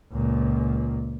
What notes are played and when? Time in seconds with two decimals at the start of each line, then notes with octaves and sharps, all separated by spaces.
0.13 C#2 A#2